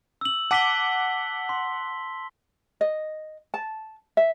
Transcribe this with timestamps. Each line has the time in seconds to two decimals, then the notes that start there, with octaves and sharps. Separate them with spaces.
0.21 E6 F#7
0.51 F#5 A5 D6 B6 G7
1.49 C6
2.81 D#5
3.54 A5
4.17 E5